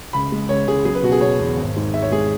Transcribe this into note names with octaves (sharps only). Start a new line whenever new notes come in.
C#2 B5
G#3
C#2 C#5
C#2 G#4
F#3 G#4
B4
B2 F#4
G#4
B2 C#5
E2
G#1
G#2
G#1 E5
C#5
G#3 G#4